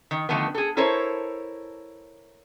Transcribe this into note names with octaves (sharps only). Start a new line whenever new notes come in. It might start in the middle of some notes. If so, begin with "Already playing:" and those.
D#3
D3 D#3 F3 A3 B3
G#4 A4
E4 A4 A#4 C5 C#5